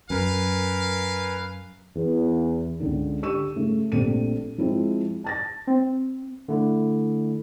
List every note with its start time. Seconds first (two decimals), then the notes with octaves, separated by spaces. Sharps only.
0.10 F#2 A#4 B4 F5 G#5
1.95 E2
2.80 C#2 D3
3.23 D3 G4 C#6 E6 D#7 E7
3.56 C#3 A3
3.92 A#1 A3 C4 G4 A4 D#7
4.58 F3 G#3 C4 E4
5.24 A5 A6 A#6
5.67 C4
6.48 D3 A3 E4